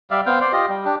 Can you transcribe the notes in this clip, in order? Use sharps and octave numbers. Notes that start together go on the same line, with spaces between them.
G3 D5 E5 F5
B3 C4 F5 G5
C5 D5 C6
F4 G4 D#5
G3
D4 G4